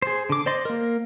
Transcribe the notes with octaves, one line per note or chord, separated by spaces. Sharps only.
G#4 C5
D3 D6
C5 D5 D#5 C6
A#3 A#4